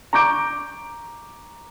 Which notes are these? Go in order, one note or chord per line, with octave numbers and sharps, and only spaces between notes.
A#5 C#6 D6 G6 D7